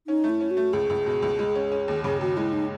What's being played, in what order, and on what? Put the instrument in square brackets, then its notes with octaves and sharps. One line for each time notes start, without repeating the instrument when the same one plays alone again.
[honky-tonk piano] C#4 [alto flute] D#4
[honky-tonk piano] A3
[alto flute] E4
[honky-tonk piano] C#4
[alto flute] F#4
[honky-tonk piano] A3
[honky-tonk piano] C#2 [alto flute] G#4
[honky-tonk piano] C#2
B2
C#2
G#3
C#4
C#4
D#2
[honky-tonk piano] C#3 [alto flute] G#4
[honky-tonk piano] D#2 [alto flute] F#4
[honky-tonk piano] G#3 [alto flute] E4
[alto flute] D#4